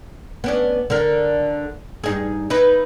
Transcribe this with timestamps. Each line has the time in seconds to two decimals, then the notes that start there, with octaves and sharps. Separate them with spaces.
0.44 B3 C#4 D4
0.90 D3 A#4
2.04 G2 D#4 G#4
2.50 D#4 E4 B4